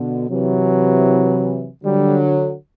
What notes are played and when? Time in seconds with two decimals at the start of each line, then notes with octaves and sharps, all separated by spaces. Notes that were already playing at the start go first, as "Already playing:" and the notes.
Already playing: B2 D3
0.30 C3 E3 F#3
1.84 D3 F#3 G3